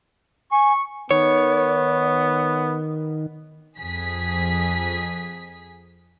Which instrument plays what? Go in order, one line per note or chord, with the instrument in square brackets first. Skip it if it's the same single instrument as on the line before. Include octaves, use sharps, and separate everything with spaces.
[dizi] G#5 [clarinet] C#6
[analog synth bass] D#3 [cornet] B3 [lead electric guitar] C#5
[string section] F2 G#4 B6